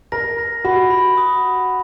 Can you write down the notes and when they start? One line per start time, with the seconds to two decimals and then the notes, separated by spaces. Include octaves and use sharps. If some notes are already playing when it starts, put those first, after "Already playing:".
0.12 A#4 A#6
0.38 A#6
0.64 F#4 B5
0.90 B5
1.17 D#6